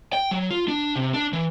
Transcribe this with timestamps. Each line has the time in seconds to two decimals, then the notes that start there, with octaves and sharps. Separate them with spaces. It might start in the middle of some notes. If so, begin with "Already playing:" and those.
0.13 G5
0.31 F#3
0.50 F4
0.68 D4
0.96 C3
1.14 D4
1.33 E3